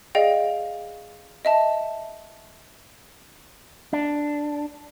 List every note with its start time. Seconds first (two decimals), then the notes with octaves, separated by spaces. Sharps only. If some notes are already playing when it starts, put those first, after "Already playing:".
0.15 G#4 D5 D#5 F5 G5
1.45 D#5 E5 A5
3.93 D4